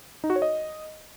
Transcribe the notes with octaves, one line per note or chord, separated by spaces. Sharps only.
D#4
F#4
C#5
D#5